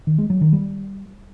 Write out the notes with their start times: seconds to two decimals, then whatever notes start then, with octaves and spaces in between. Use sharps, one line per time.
0.07 D#3
0.18 G#3
0.30 F#3
0.41 D#3
0.53 G3